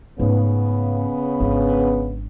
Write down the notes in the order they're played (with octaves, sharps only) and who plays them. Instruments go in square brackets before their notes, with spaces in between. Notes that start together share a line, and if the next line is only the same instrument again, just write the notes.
[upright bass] G#2 A3 [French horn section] C#3 B3
[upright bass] G#1 D4